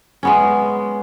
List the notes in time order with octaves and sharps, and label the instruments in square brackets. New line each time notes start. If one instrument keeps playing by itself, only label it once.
[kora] G#3 B3 C#4